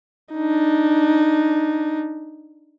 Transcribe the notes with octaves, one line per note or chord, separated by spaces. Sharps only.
D4 D#4